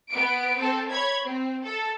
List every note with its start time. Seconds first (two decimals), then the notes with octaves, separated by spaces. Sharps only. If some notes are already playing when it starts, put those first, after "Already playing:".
0.10 B3 D7
0.59 C4 A4
0.91 C#5 B5 G#6
1.26 C4
1.65 A4